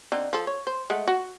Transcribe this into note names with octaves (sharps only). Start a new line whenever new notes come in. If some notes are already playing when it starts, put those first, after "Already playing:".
D3 C4 D#4
F3 A4
C#5
C5
G#3 A3 F#5
F#4